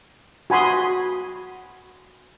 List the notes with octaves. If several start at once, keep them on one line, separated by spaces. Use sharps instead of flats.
F#4 G#5 B5 C6 D#6